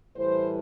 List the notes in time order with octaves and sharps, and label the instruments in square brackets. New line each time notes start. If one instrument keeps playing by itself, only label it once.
[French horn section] A2 E3 G3 C5